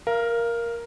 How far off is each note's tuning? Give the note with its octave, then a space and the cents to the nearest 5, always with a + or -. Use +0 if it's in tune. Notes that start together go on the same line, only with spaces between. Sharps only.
A#4 +5 F5 -25